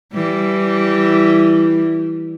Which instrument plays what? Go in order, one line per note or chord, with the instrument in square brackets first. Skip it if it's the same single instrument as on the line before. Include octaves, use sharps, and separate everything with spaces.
[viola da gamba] E3 G3